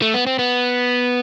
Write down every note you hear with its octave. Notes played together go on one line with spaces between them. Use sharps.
A3
B3
C4
B3